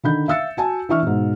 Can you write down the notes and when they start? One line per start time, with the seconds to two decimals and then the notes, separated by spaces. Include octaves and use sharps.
0.03 D3 D#3 B5 G6
0.28 E5 F5 E6 A6 C#7
0.57 F#4 G#5 A5
0.89 E3 D4 E5 C#6 F6
1.02 G#2 B2